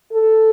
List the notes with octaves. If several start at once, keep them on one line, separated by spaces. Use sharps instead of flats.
A4